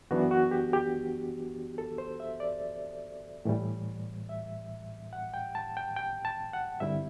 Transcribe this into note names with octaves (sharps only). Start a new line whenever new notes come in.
F#2 E3 B3 D4 F#4
F#4
G4
G4
A4
C5
E5
D5
A2 E3 G3
E5
F#5
G5
A5
G5
G5
A5
F#5
G2 D3 G3 C4 E4 E5